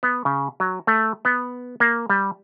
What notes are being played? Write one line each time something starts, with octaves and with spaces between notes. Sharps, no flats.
B3
C#3
F#3
A3
B3
A#3
G3